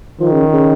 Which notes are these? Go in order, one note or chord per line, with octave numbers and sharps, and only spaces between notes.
D#3 F3
C#3
C#3